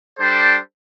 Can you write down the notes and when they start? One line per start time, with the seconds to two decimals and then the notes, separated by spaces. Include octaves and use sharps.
0.18 G3 D4 A4 C5